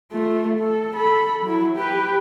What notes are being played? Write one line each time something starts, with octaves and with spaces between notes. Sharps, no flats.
A3 F4
A4
A4 B5
F#3 E4
G4 B4